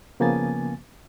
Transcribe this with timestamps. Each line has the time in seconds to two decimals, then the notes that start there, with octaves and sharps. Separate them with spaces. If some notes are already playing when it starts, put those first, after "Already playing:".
0.20 C#3 F3 A#3 B3 G#5 A6